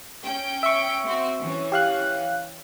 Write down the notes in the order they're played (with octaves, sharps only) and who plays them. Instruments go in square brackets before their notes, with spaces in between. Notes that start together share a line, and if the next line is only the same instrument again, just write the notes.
[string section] C#4 G5
[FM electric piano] E5 C#6
[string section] C4 F#4
E3 C#4
[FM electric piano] G4 F5 F#6